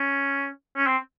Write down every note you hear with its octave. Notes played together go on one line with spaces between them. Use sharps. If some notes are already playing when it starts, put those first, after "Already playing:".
Already playing: C#4
C#4
C4